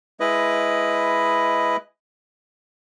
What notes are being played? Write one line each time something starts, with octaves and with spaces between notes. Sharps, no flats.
G#3 E4 B4 D#5